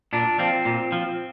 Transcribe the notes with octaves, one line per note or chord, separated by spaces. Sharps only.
A#2 D4
F3 C4
A#2
F3